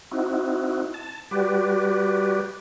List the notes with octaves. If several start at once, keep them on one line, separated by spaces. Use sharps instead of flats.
C4 D#4 E4 F#4
A5
G3 F#4 G4 B4 D5